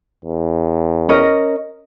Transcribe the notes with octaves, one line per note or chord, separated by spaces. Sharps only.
E2
C#4 A#4 D#5